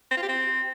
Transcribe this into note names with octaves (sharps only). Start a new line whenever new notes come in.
C4
F4
G4
C4